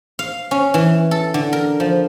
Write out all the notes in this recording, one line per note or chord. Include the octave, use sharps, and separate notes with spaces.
F5
C#4
E3
A4
D3
A#4
F3